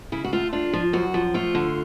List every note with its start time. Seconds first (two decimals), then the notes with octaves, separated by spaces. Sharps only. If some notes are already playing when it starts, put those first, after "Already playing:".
0.12 C#3 E4
0.24 F#4
0.33 A3 F4
0.53 D4 F4
0.73 F3
0.93 F#2 F#4
1.14 F3
1.34 A3 F4
1.55 D3